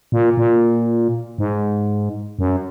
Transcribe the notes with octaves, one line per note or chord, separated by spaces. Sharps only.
A#2
A#2
G#2
F#2